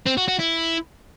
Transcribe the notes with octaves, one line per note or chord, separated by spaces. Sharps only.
C4
F#4
F#4
E4